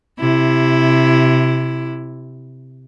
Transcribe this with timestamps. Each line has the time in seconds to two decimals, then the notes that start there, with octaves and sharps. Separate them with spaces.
0.20 C3 E4